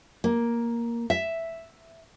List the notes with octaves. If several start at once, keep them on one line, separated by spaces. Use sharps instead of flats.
A#3
E5